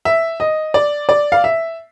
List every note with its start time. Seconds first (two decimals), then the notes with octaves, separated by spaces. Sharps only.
0.05 E5
0.40 D#5
0.74 D5
1.09 D5
1.32 F5
1.44 E5